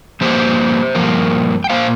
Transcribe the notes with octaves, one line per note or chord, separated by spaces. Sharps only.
G2 F3 A#3 G4 C5
G2 F3 A#3
G5
A#2 G3 A#3 C5 F5